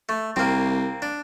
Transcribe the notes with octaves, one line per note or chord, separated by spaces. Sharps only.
A3
C2 A#3 C4
D4